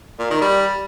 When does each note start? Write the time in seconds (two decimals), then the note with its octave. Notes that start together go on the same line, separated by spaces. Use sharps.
0.19 A#2
0.30 D#3
0.42 G3